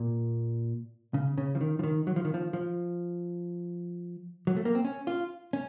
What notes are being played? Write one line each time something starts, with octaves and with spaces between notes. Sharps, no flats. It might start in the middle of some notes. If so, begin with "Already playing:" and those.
Already playing: A#2
C#3
C#3
F3
D#3
F3
D#3
F#3
F3
D#3
F3
F3
F#3
A3
A#3
C4
C#4
F4
C#4